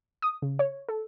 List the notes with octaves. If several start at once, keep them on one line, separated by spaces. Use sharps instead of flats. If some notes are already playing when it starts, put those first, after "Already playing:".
D#6
C#3
C#5
A4